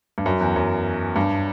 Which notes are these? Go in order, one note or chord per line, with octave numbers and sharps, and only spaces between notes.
G2
F#2
E2
F#2
G2